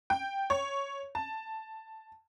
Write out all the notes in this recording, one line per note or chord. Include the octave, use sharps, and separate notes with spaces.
G5
C#5
A5